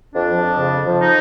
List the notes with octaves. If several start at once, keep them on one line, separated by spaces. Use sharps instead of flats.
F2 D4
F3
F2
C#3
F2
F3
D#4